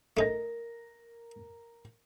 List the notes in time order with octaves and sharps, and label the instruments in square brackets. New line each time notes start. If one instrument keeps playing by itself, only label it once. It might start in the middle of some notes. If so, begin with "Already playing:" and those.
[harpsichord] A3 D#4 [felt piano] A#4 A#6